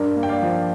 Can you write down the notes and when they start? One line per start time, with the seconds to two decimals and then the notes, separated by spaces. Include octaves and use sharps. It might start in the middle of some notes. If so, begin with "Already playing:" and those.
Already playing: G2 A#4 D5
0.16 A#3
0.23 G5
0.29 D5 F5
0.42 F3